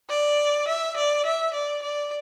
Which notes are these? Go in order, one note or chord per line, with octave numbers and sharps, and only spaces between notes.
D5
E5
D5
E5
D5
D5